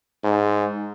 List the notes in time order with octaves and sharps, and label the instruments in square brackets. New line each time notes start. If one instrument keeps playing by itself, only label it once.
[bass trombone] G#2